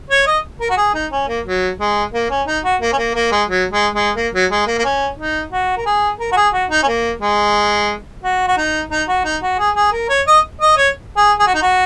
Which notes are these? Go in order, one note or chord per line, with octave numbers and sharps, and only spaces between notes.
C#5
D#5
A#4
F#4
G#4
D#4
C#4
A#3
F#3
G#3
A#3
C#4
D#4
F#4
A#3
C#4
A#3
A#3
G#3
F#3
G#3
G#3
A#3
F#3
G#3
A#3
A#3
C#4
D#4
F#4
A#4
G#4
A#4
F#4
G#4
F#4
D#4
C#4
A#3
G#3
F#4
F#4
D#4
D#4
F#4
D#4
F#4
G#4
G#4
A#4
C#5
D#5
D#5
C#5
G#4
G#4
F#4
D#4
F#4